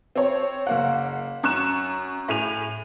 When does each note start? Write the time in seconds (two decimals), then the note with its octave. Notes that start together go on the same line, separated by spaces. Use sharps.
0.16 C4 C#5
0.67 F#1 A#3 F#5
1.43 F#2 C#6 F#6 E7
2.28 A2 G#4 D#7 F7